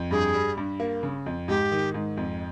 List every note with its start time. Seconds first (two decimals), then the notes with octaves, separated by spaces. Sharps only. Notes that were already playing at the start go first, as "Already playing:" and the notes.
Already playing: F2
0.11 G2 G#4
0.34 G3
0.57 G2
0.80 A#3
1.03 C#3
1.26 F2
1.48 G#2 G4
1.71 D#3
1.94 G#2
2.17 F2